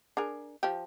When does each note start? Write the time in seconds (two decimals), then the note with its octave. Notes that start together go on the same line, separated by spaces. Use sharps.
0.17 D4 G#4 A#4
0.63 F3 G4